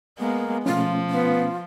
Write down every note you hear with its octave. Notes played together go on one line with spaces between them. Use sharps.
G#3 A#3 B3
B2 F3 A3 C#4 F4
B3 F4